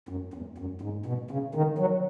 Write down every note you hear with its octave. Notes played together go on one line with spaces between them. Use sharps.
F#2
E2
F#2
G#2
B2
C#3
D#3
F#3